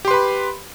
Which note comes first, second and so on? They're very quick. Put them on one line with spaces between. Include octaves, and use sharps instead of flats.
G4 C6 B4 B5